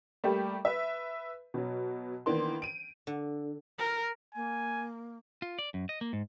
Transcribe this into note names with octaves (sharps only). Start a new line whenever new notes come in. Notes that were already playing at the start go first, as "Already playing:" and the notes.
G3 A3 A#3 G4
B4 E5
B2 F#3
D#3 E3 A#3 B3 D4 C6
D7 D#7
D3
A#4
A#3 G#5
F4
D5
F#2
D#5
A#3
G#2